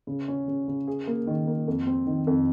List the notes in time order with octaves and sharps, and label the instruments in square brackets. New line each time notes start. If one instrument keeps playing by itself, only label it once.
[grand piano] C#3
C#4
C#3
C#3
G#4
A#3
D#3
A#3
F2
C4
D#3
F2